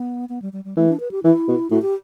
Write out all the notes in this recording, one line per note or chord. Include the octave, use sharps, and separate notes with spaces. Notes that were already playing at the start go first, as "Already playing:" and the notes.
Already playing: B3
B3
G3
G3
G3
E3 A3
D4
B4
G4
E3 E4
B2
A2 F#4
G4